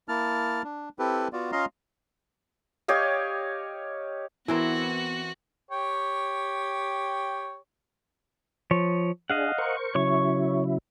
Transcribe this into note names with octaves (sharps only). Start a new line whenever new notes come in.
A#3 E4 A5 F6
D4
C4 E4 G4 A4 B4
B3 F4 F#4 D5
C#4 F4 D#5 F5 A#5 C6
G4 C#5 D#5 F5
E3 B3 C4 E4 F#4 A#4
G4 C#5 G5
F3 C#5
D4 G#4 D#5 F5 F#5
A#4 C5 C#6
C#3 F#3 E4 C#5 C#6